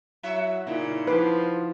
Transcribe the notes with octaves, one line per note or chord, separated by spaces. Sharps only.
F#3 E4 F#4 E5
A#2 C#3 D#4 E4
F3 B4 F#5 C6 D6